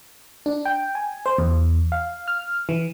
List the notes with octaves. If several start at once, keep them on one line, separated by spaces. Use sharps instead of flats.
D4
G5
G#5
C5
E2
F5
F6
E3